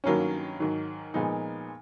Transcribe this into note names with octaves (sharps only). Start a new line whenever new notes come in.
G2 D#3 F#3 A#3 C#4
G#2 D#3 F#3
A#2 F3 G#3 B3 D#4